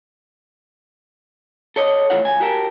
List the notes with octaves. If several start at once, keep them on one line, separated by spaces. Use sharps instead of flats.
A4 C#5 D#5
A2 E3 A3 F4 C#5 F#5
C#2 G#5
F#4 G4 A#4 F5 A5